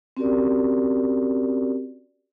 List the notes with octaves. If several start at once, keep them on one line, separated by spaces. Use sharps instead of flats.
C4 C#4 F#4 G4 A#4 D5